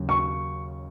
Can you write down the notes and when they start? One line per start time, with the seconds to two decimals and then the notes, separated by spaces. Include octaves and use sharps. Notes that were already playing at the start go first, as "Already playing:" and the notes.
Already playing: D#2 C#3 F#3
0.09 C#6